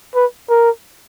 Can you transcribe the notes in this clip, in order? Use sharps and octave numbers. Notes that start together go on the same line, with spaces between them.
B4
A#4